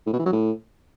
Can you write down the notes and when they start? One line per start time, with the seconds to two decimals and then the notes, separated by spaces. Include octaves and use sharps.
0.07 A2
0.13 B2
0.19 E3
0.26 F#3
0.32 A2